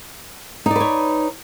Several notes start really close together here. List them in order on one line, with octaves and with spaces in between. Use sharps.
D#4 D5 B4 C#5